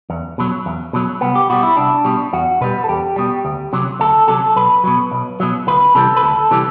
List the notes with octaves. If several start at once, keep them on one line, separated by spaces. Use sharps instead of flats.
E2
B2 F#3
E2
B2 F#3
C2 B3
G4
B2 G3 F#4
E4
C2 D4
B2 G3
E2 F#4
B2 G3 B4
A4
E2 G4
B2 G3
D2
C3 F#3
D2 A4
C3 F#3 A4
B1 B4
B2 F#3
B1
B2 F#3
D2 B4
C3 E3 G3 A4
B4
D2 A4
C3 E3 G3